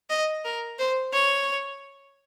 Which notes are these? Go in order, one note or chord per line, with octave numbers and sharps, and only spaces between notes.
D#5
A#4
C5
C#5